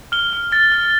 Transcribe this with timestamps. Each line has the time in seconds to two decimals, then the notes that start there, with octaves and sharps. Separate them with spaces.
0.12 F6 G7
0.33 F6
0.52 F6 A6
0.72 F6